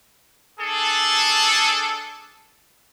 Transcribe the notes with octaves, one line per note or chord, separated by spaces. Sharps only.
D4 G#4 A4